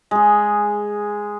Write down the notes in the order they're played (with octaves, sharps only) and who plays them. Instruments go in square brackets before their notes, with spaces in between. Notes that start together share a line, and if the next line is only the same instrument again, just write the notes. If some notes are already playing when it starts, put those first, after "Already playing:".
[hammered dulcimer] G#3 G#4